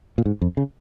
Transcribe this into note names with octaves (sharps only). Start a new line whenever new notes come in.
A#2
G#2
F2
C#3